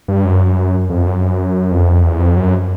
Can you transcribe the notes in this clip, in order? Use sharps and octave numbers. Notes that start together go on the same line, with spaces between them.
G2
F#2
F2
F#2
F2
E2
F2
F#2